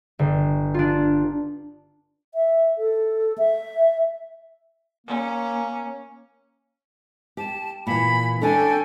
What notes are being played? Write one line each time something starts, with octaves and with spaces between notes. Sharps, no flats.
G1
D4 F4
E5
A4
E5
A#3 C#4
G4 A5
A#2 E3 B5
C#4 D4 A4 G5 G#5